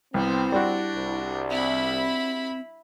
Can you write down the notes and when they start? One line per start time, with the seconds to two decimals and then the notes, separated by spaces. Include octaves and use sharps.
0.14 C2 B3 C4 E4 C5
0.52 G3 D4 F#4
0.96 C2
1.50 C4 E4 B5